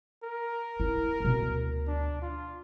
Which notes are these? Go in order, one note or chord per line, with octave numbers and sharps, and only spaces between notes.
A#4
E4
D2 B2
D4
F4